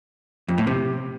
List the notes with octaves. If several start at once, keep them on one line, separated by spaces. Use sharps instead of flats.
F2
A2
C3